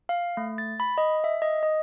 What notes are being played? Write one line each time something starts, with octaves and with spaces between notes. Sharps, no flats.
F5
A3
A6
B5
D#5
E5
D#5
D#5